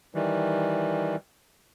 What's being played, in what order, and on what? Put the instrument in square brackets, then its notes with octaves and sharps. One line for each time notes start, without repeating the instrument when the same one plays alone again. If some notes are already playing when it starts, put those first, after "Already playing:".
[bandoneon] D#3 E3 G3